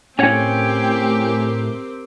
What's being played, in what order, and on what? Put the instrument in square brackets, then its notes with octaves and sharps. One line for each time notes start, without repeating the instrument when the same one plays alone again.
[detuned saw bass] A2 [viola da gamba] C4 G4 A#4 [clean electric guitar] C#4 C#5 F#5 [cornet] G5